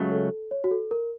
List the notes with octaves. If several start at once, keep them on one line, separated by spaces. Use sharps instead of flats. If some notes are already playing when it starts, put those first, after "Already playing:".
Already playing: C#2 C#3 F#3 A3
A4
C#5
F#4
A4
A#4